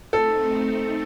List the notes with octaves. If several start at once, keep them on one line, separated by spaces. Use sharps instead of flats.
A3 C4 D#4 A4